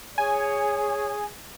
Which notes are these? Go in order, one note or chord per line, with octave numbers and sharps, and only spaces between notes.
G#4 C#5 G#5